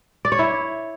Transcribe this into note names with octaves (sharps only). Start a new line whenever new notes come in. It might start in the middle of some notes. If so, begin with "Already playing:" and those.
D5
C#5
E4